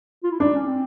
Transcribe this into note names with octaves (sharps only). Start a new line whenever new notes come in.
F4
E4
D4 D#4
C#4
C4